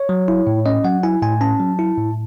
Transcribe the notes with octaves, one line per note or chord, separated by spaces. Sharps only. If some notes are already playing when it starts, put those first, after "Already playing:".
Already playing: C#5
F#3
E4
A2
C#4 D#5
F#3 F#5
E4 G#5
A2 G#5
C#4 A5
F#3
E4
A2